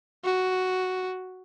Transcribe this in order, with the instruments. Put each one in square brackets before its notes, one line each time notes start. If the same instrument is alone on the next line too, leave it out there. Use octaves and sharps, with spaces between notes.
[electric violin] F#4